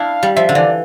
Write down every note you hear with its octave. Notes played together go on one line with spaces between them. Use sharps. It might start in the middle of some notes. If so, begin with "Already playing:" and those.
Already playing: D4 E4 F5
G3
F3 E5
D3
E3 D5